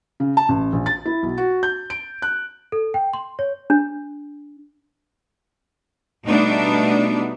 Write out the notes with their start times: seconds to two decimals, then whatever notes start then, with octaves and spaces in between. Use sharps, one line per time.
0.20 C#3
0.37 A5
0.49 A1
0.73 A#1
0.86 A6
1.05 E4
1.23 B1
1.38 F#4
1.63 G6
1.90 D7
2.22 F#6
2.72 A4
2.94 G5
3.13 C6
3.39 C#5
3.70 D4
6.26 B2 G3 A3 B3 D4 D#4